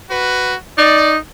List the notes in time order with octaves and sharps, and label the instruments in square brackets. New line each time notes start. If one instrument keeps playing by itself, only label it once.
[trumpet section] F#4 B4
[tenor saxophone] D#4 [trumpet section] D5